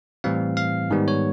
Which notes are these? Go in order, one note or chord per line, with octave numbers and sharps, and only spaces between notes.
A2 E3 G3 C4 F5
F5
G#2 D#3 G3 B3
C#5